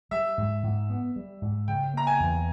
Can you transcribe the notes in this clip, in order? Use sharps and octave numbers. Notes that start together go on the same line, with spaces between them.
G3 E5
G#2
G#2
B3
G3
G#2
C#3 G5
A#3 A#5
G#5
E2